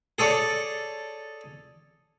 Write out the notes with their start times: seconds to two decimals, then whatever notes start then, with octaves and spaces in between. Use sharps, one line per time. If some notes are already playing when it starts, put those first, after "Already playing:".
0.19 G#4 A4 C#5 D5